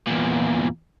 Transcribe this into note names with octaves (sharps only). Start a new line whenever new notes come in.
E2 A#2